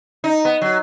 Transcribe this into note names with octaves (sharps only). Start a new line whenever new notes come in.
D#4
B3
F#3